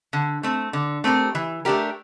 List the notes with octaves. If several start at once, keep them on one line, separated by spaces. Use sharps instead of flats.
D3
A3 C4
D3
A3 C4 G4 A#4
E3
A3 D4 G4 A#4